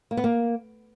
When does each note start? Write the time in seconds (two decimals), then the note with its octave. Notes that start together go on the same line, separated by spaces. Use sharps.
0.11 A#3
0.17 B3
0.24 A#3